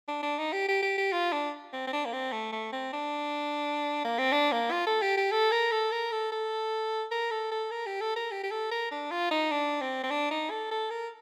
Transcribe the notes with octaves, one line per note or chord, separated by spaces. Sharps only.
D4
D4
D#4
G4
G4
G4
G4
F4
D4
C4
C4
D4
A#3
C4
A3
A3
C4
D4
A#3
C4
D4
A#3
F4
A4
G4
G4
A4
A#4
A4
A#4
A4
A4
A#4
A4
A4
A#4
G4
A4
A#4
G4
G4
A4
A#4
D4
F4
D#4
D4
C4
C4
D4
D#4
A4
A4
A#4